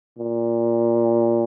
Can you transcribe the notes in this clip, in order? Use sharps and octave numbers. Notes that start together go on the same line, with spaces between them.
A#2